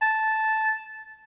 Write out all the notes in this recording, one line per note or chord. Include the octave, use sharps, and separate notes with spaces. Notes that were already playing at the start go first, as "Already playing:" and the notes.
A5